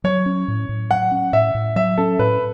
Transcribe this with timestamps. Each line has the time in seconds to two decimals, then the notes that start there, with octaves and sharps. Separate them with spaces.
0.04 F#3 C#5
0.26 C#4
0.48 A2
0.69 A2
0.90 F#3 F#5
1.11 C#4
1.33 A2 E5
1.55 A2
1.76 F#3 E5
1.98 C#4 A4
2.19 A2 B4